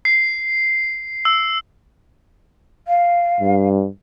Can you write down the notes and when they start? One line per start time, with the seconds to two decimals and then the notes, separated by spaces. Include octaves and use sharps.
0.05 C7
1.25 E6
2.87 F5
3.41 G2